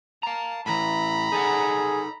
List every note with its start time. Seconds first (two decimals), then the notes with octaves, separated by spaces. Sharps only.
0.23 F5 A5 A#5
0.66 A2 E3 A#5 B5
1.33 D#4 G#4 A4 F#5